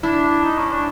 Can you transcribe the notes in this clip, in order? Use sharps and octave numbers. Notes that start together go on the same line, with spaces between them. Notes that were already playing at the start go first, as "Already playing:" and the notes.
D4 E4
D#4
C#4
D4